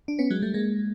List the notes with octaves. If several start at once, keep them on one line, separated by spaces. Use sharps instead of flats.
D4
B3 C#4
F#3 G#3
G3 A3
G#3 A#3